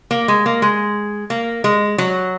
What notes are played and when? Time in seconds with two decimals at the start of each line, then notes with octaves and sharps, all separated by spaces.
0.11 A#3
0.28 G#3
0.46 A#3
0.62 G#3
1.30 A#3
1.64 G#3
1.98 F#3